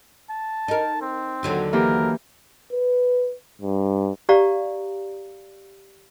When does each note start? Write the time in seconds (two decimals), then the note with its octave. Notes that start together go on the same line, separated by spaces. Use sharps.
0.30 A5
0.68 D#4 A#4
1.01 C4
1.43 D#2 D3 F#3
1.73 E3 A#3 G4 A#4
2.72 B4
3.62 G2
4.29 G4 D5 F5 A#5